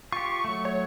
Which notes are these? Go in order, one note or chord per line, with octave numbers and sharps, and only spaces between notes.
F4 G4 C#6
F#3 A3
C#5